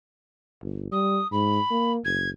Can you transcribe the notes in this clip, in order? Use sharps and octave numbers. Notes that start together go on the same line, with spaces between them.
G1
G3 D#6
G#2 B5
A#3
F#1 G#6